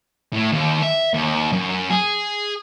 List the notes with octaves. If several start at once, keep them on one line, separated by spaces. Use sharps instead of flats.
A2
D#2
E5
D#2
F#2
G#4